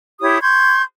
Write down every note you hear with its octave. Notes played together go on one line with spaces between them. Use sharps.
E4 G4 C#5 D#6
C6 C#6 G6 G#6